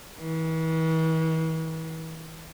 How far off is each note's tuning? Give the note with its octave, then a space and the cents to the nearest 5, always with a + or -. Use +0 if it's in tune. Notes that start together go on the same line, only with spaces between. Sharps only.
E3 -40